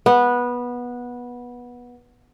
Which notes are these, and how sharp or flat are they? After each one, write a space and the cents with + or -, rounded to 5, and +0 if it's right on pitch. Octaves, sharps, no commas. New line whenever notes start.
B3 -15 F#5 -10